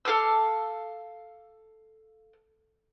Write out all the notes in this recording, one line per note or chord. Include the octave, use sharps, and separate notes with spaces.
A4 F5 D6 E6